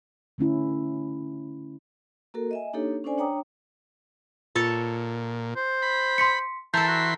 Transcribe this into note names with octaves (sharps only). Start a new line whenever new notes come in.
D3 A3 C#4 E4
A#3 F#4 A4 A#4
D#5 E5 G#5
A#3 D4 D#4 G4 A4 C#5
C#4 D4 A4 C5 D5 G#5
D4 C#5 G5 A#5 D6 D#6
A#2 F4 A4 C#5 A5
C5
B5
C6 B6 C#7
E3 A4 A#4 A5 B5 C6 G6
F#4